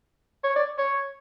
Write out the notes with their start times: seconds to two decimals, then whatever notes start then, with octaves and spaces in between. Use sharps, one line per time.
0.44 C#5
0.56 D5
0.78 C#5